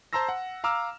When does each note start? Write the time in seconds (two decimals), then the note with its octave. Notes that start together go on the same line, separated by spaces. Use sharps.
0.13 C5 A5 A#5 C6 E6 A#6
0.29 F#5
0.64 F5 A#5 D6 E6 F6